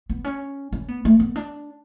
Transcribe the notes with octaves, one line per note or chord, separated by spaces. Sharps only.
B3
C#4
C#4
B3
A3
B3
D4